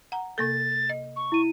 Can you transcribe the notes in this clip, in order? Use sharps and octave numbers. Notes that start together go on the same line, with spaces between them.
F#5 A#5
C3 A#3 A4 A6
D#5
C#6
E4 D#7